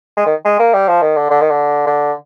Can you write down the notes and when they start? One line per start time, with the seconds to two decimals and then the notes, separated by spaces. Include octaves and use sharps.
0.17 G#3
0.26 D#3
0.45 G#3
0.59 A#3
0.74 G3
0.88 F3
1.02 D#3
1.16 D3
1.31 D3
1.41 D#3
1.50 D3
1.87 D3